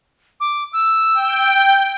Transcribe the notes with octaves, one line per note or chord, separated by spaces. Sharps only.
D6
E6
G5